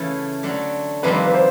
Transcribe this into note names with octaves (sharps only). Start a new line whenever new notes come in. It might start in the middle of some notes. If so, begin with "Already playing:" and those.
Already playing: C#3 E3 A3
D3 F#3 A3 D4
F2 C3 D#3 G3 A#3 B4
B4
C5